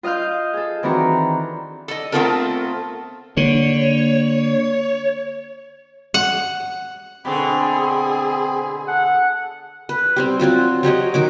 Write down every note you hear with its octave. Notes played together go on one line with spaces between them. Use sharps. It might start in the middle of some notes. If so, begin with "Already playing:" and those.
F4 D#5 F5 F6 G6
G#4 A4
D#3 E3 C4 D4 F#4 A#5
A4 D5 D#5
A3 B3 C4 F4 A4 A#4
D3 A#3 C#5
F#5
B2 D3 C4 G#4 B5
A4 F#5
B4
G3 C4 G4
F#3 C4 F4 F#4
F#3 G4 C#5 D#5
D#3 F#3 D6